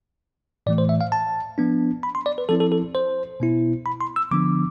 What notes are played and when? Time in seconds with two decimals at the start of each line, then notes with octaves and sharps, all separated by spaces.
0.66 A2 E3 A3 D5
0.78 C5
0.89 E5
1.01 F5
1.12 A5
1.58 F3 B3 D4
2.03 B5
2.15 C6
2.26 D5
2.38 B4
2.49 F3 C4 E4 A4
2.60 A4
2.72 A4
2.95 C5
3.40 B2 B3 E4
3.86 B5
4.01 C6
4.16 E6
4.31 D3 F3 B3 D4 D6